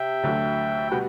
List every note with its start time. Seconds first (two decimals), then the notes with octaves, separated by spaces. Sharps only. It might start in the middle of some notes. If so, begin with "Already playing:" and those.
Already playing: C3 E5 G5
0.23 D2 D3 F#3 A3
0.91 B2 G3 B3 F#4 B4